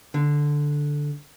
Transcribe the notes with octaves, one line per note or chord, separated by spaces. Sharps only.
D3